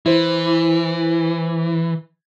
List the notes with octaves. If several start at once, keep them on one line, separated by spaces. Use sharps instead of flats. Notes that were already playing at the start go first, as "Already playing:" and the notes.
E3 E4 C5